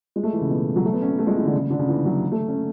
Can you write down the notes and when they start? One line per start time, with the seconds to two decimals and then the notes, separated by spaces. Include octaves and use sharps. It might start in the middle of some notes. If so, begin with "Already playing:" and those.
0.16 G#3
0.24 A3
0.33 E3
0.41 C#3
0.50 B2
0.76 F#3
0.85 A3
0.93 B3
1.02 C#4
1.10 B3
1.19 A3
1.27 G#3
1.37 E3
1.45 D3
1.54 C#3
1.70 D3
1.79 C#3
1.89 E3
2.05 F#3
2.32 A3
2.48 C#4